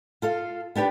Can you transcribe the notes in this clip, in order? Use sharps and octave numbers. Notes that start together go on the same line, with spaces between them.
F4 A4 F5
B3 D4 G4 B4